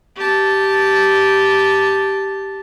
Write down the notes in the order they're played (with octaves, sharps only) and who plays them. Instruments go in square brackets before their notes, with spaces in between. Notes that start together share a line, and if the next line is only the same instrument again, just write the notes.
[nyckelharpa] G4 A5